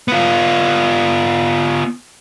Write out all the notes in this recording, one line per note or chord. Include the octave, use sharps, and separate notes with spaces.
B3 F4